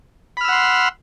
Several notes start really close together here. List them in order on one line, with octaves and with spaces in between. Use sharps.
B5 F6 E6 F#5 C6